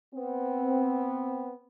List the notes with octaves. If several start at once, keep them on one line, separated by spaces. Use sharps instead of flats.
B3 C4